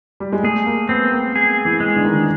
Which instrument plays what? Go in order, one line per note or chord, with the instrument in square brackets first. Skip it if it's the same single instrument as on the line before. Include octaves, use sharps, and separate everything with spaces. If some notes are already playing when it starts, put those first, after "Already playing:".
[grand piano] G3
G#3
[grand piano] A3 [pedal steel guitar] G#4
[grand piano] A#3
[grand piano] B3 [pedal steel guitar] C4
[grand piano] A#3
[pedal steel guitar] G#4
[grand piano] E3
[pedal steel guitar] G#3
[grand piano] D3
D#3
D3